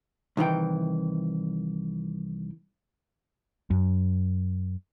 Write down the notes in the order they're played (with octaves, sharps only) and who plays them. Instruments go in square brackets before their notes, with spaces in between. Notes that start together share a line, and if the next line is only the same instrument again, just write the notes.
[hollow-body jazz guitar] C2 D#3 E3 G5
[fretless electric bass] F#2